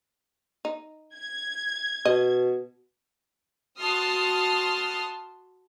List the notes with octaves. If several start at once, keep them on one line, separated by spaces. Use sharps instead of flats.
D#4
G#6
B2 D#5
F#4 A5 C6 D#6 F6